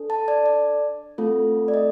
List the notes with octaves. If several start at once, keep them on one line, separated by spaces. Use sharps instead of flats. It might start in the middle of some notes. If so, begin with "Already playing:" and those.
Already playing: D4 A4
A5
D5
D5
A3 C4 F4 A4
D5
D#5